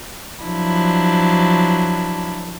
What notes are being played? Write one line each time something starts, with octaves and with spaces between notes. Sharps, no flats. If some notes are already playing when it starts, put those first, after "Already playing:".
F3 F#3 D4 E4